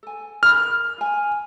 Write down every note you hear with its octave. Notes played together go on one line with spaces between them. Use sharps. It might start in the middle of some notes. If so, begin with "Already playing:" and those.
A4 G#5
A#4 B5 F6
F4 G#5